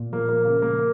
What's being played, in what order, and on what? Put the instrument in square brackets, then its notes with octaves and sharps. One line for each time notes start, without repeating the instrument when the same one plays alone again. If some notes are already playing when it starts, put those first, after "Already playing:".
Already playing: [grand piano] A#2
F3 A#3
A#3
C#3 A#3
A#3